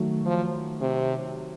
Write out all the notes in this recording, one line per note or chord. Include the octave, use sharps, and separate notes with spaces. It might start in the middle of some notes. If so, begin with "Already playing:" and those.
Already playing: D#3 F#3 A3
F3
C3